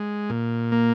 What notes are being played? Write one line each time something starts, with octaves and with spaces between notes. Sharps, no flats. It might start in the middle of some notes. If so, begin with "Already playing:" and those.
Already playing: G#3
A#2
A#3